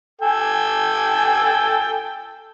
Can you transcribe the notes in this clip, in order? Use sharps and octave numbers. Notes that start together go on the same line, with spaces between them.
A4 G5 G#5